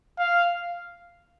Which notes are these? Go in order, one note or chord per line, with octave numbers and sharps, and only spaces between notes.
F5